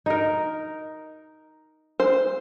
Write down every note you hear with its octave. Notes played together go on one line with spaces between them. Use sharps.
D#4 A#4
C5